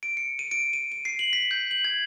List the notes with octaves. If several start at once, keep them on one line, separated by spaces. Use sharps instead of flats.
D7
C#7
D#7
D7
D#7
D#7
C7
F#7
B6
G6
F#7
G#6